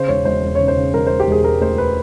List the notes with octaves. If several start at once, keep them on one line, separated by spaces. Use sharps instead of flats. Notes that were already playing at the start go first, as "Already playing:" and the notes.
Already playing: C#3 C5
E1 C#5
E1 C5
E1
C#3 C#5
C5
C#3
E1 A#4
E1 C5
G4
E1 G#4
E1 A#4
D2 C5
B4